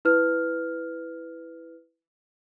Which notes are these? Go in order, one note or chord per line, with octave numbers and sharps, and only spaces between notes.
E4 B4 F6